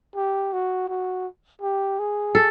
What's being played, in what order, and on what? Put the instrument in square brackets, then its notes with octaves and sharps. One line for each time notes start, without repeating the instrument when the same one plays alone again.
[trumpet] G4
F#4
F#4
G4
G#4
[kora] A4